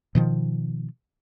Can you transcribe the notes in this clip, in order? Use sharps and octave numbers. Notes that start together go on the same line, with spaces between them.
B2 D#3 F3